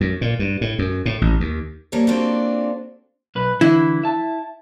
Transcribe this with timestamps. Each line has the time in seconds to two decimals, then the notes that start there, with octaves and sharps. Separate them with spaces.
0.01 F#2
0.21 A#2
0.39 G2
0.61 A2
0.79 F#2
1.06 A2
1.21 A1
1.40 D#2
1.92 F3 G3 A#3 A4 C#5 D5
2.07 A#3 C4 D4 F4 F#4 A4
3.35 B1 B4
3.61 D3 E3 E4
4.04 E5 A5